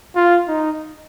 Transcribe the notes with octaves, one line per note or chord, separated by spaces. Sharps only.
F4
D#4